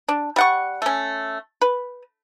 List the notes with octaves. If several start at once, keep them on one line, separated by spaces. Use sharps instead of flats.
D4
G3 F#5 C#6
A3 C#4
B4